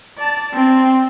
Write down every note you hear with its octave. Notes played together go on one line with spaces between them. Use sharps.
D5 A5
C4